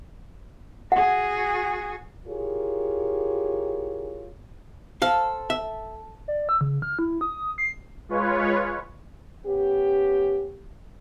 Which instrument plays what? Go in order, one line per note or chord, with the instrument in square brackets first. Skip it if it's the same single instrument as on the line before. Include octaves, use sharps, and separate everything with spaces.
[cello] F#4 G#4 [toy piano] F#5
[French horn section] E4 F4 G4 G#4 A#4 C#5
[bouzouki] A4 [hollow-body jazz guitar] C5 F5
[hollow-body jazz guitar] E5
[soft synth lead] D5
E6
C#3
F6
E4
D#6
C7
[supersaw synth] G#3 F4 B4 C#5
[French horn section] B3 C#4 G4